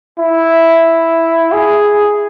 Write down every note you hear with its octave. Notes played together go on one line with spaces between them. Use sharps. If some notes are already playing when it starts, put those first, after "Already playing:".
E4
G#4